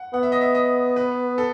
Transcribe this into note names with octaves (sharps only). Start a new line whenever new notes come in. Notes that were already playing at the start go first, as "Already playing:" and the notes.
Already playing: F#5
B3 F#5
E5
D#5
E5
D#5
B4
A4